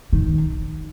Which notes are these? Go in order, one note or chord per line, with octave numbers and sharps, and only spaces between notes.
D#3